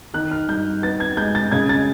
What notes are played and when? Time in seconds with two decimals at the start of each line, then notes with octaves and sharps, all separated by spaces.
0.14 D#3 F#6
0.31 F6
0.48 G2 G6
0.82 B3 A6
1.00 G#6
1.17 G#3 G6
1.35 A6
1.51 C#3 G#6
1.69 A6